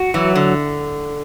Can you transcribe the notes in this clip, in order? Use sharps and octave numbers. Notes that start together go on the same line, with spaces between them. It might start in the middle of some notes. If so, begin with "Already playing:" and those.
Already playing: F#4
E3 F#3
D3